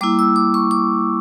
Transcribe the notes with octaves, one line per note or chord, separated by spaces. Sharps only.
G3 A#3 E4 D6
E6
D6
C#6
D6